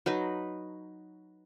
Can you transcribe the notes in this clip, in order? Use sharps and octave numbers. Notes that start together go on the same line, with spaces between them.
F#3 D#4 B4